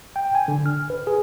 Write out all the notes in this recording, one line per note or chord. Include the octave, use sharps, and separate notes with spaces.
G5
G#5
D3
F6
B4
G#4